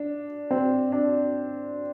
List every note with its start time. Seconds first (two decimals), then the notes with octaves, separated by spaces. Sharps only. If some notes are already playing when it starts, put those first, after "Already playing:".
Already playing: D4
0.51 C4
0.92 D4